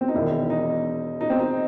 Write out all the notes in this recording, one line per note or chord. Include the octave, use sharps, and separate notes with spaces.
C4
D#4
E1 E2 D#3 E4
D#4
D#4
C4
D#4